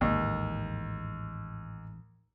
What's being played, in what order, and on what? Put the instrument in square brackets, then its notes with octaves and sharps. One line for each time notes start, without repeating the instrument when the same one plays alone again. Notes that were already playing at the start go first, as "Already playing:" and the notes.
[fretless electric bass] A1 G#2 [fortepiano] D#2